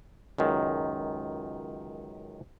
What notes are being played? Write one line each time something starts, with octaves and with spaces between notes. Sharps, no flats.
C#2 F#2 D#3